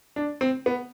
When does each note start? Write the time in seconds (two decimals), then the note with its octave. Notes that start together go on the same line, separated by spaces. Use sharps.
0.16 D4
0.41 C4
0.66 B3